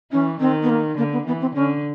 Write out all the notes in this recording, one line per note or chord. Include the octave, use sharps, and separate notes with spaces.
E3 C#4
D#3 C4
B3
A#3
D3 A#3
B3
E3 B3
C4
D3 C#4